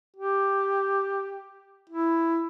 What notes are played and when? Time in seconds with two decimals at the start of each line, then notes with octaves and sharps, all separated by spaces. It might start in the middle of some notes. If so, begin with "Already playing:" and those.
0.16 G4
1.90 E4